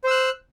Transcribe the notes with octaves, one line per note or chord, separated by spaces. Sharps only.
C5 E6 F#6